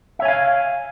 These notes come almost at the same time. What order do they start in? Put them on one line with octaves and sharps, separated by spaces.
E5 C#5 G#5 F5